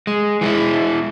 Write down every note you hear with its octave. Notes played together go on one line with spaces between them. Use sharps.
G#3
E3 G#3 E4